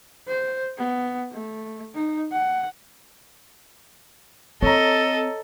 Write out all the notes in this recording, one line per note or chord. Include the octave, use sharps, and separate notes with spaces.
C5
B3
A3
D#4
F#5
C4 A4 C#5 D#5 A#5